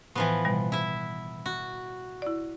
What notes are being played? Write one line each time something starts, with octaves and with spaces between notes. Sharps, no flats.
A2 E3 F3 B3
B2 D#3 G3
E4 E5
F#4
E4 D5